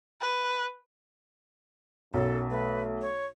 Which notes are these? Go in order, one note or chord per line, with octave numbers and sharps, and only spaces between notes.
B4
B1 F#2 A4
A3 B4
C#5